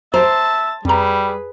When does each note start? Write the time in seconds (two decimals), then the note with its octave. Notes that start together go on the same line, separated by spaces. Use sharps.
0.14 C5 E5 A5 A#5
0.85 F2 G3 G#4 B4 A#5